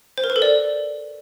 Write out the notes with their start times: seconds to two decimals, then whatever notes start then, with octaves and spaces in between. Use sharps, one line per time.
0.18 C5
0.24 A#4
0.30 B4
0.36 A4
0.42 D5